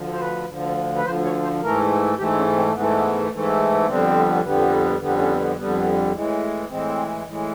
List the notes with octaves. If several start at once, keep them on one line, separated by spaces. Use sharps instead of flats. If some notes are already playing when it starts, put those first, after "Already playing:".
Already playing: D2 D3 F3
C5
B4
D2 D3 F3
B4
D2 D3 F3 C5
C#5
C5
G#2 E3 A3 A#4
G#2 E3 A3 G4
C#4
C4
G#2 E3 A3 B3
B3
G#2 E3 A3
F2 D3 G3 B3 C4
F2 D3 G3 B3
F2 D3 G3 B3
C#4
C4
F2 D3 G3 B3
A2 E3 G#3
A2 E3 G#3 C4
A2 E3 G#3